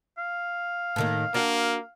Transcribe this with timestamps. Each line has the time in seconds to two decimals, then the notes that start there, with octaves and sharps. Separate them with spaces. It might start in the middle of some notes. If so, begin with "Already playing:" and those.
0.18 F5
0.96 A2 D#3 A#3
1.34 A#3 D4 F#4